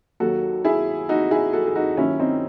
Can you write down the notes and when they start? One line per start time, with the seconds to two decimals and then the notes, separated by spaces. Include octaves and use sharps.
0.20 D#2 D#3 F#3 F#4 A4
0.65 E4 G#4
1.09 D#4 F#4
1.31 E4 G#4
1.53 F#4 A4
1.67 G#4
1.75 D#4 F#4
1.97 D#2 D#3 F#3 C#4 E4
2.20 C4 D#4